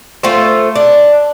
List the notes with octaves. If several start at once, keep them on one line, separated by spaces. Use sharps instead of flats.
A3 F4 C5
D4